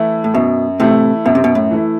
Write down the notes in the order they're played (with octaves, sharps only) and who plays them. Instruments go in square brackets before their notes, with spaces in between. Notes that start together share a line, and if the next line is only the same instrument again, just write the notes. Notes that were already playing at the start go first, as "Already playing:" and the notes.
Already playing: [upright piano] E3 A3 E4
[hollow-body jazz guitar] A2
[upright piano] F#2 [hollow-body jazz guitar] B2
[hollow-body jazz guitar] A2 C3 [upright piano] E3 A3 E4
[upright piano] F#2 [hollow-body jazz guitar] B2
[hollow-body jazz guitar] C3
B2
A2
[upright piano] E3 A3 E4